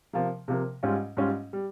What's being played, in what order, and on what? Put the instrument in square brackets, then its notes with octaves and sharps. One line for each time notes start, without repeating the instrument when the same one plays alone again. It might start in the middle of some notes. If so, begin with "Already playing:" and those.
[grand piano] C3 F3 A#3
C3 F3 A#3
G#2 G3 C#4 F4
G#2 G3 C#4 F4
G3